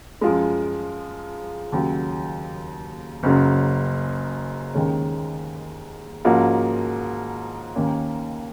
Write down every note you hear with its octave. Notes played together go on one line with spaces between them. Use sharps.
F#2 F3 G#3
D#2 C#3 F#3
F#1 F#2 C#3 F#3
D#2 D#3 G#3 C#4
G#2 F3 A#3 C#4 F#4
D#2 D#3 A#3 C#4